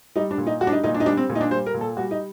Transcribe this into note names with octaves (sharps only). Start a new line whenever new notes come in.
G3 D#4
D4
A#2
D#4
G3 F#4
D4
D#4
A#2 D#4
D4
D#4
G3 D4
C4
A#2
D#4
D4
G3 C5
A#4
A#2
A4
G3 F#4
D#4